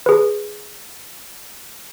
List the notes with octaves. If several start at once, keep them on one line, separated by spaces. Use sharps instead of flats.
G#4 B4